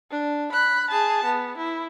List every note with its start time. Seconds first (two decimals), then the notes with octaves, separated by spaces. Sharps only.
0.11 D4
0.52 B5 F#6
0.90 G#4 A5
1.24 B3
1.57 E4